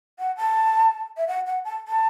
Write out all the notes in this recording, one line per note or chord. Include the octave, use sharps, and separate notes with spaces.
F#5
A5
E5
F#5
F#5
A5
A5